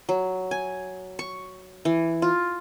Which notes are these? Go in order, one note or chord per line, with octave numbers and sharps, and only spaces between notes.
F#3
G#5
C#6
E3
F4